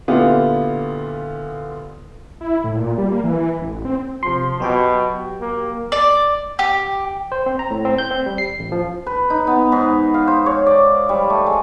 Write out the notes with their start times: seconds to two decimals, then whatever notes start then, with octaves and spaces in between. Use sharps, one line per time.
0.08 A#2 D3 B3 E4 F4 G4
2.41 E4
2.64 A2
2.77 A#2
2.98 G3
3.12 A#3
3.24 E3
3.61 A1
3.85 C4
4.23 C3 F3 C6
4.60 B2 F#3 G4 G5
5.41 A#3
5.92 D5
6.59 G4
7.32 C5
7.46 C4
7.59 A#5
7.71 A2
7.85 C4
7.98 G6
8.11 C4
8.26 G3
8.38 C7
8.59 A1
8.72 F3
9.06 B4
9.30 D#4
9.47 B3
9.72 G#2
10.14 F5
10.27 C5
10.46 C#5
10.66 D5
11.09 G3
11.30 A3
11.47 G#3